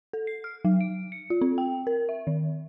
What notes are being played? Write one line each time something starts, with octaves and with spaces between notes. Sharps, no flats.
A4
C7
F6
F#3
D7
C#7
F4
C4
G5
A#4
E5
D#3